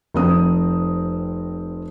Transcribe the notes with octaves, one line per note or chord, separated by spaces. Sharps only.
F1 C4 D#6